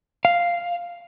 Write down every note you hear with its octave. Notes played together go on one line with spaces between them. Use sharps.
F5